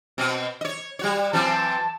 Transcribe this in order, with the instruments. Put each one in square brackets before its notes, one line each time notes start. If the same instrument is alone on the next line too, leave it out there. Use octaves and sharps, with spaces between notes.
[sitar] B2 C4
C#5 D#5
G3 F#4 C#5
[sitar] E3 F#3 C4 [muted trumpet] A5